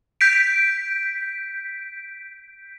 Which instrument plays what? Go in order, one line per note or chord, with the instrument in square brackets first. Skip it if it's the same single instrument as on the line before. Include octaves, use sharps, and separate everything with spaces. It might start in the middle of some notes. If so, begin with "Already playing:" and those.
[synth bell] G6 B6 D7